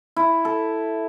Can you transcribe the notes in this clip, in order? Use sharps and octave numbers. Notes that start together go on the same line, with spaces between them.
E4
A4